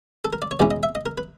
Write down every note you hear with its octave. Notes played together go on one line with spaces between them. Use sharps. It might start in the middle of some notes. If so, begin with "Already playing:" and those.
A4
A#4
D5
C#5
E2 B2 G#3 C#4 E4 D5
D#5
E5
D#5
A#4
B4